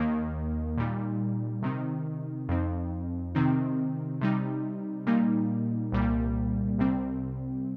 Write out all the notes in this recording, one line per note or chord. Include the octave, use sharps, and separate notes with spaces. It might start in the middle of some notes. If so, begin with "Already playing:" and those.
Already playing: D#2 D#3 A#3
A#2 G3 D#4
C3 D#3 C4 D#4
F2 F3 C4 D#4
C3 D#3 C4 D#4
C3 G3 D#4
A#2 G3 A#3 D#4
C2 A#2 G3 A#3
C2 C3 G3 C4